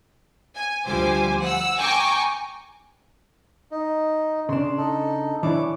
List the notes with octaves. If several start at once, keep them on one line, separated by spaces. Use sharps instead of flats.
G#5
D2 F3 G3 C5 G#5 D6
F#5 E6
G5 G#5 A#5 C#6 D6
D#4
C#3 D4 C6
D#4 A4
E3 D4 C#5 D6